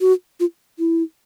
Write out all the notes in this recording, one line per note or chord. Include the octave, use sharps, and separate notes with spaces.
F#4
F4
E4